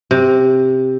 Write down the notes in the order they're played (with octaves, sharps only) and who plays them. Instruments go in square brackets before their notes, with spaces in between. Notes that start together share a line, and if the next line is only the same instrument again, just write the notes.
[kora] C3